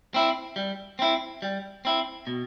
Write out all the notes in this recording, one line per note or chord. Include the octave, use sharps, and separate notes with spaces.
C4 E4
G3
C4 E4
G3
C4 E4
B2